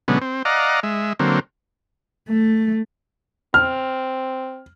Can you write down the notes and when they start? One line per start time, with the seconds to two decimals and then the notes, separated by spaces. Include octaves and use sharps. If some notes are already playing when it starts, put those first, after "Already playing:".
0.08 B2 D3 F#3 G#3 B3 C#4
0.22 C4
0.45 D5 D#5 F5 F#5 A#5
0.83 G#3 E5
1.19 D3 F#3 A#3 C4
2.29 A3
3.54 C4 F6